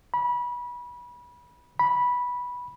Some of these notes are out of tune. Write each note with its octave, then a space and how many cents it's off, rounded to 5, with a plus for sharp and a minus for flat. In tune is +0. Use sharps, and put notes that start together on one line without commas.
B5 -25
B5 -10